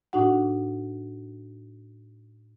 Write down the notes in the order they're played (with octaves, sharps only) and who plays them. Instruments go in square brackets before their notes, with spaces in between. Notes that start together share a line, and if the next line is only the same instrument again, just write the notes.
[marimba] A2 D4 D#4 F#4 F#5